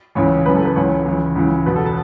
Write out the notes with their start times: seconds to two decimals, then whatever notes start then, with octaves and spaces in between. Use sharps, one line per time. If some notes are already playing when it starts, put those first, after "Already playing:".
0.15 C#2 C#3 E3 C#5
0.46 F#2 C#3 E3 B4
0.56 A4
0.65 B4
0.76 C#2 C#3 E3 C#5
1.06 C#2 C#3 E3
1.36 C#2 C#3 E3
1.66 E2 B2 B4
1.76 A4
1.86 A5